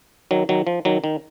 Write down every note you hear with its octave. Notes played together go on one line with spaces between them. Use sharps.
D#3 F#3
D#3 F#3
F3
D#3 F#3
D#3